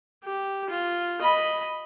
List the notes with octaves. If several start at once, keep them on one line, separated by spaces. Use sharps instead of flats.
G4
F4
D#5 B5